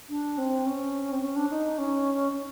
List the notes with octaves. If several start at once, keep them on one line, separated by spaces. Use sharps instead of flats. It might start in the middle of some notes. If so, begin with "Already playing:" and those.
D4
C4
C#4
C4
C#4
D4
D#4
C#4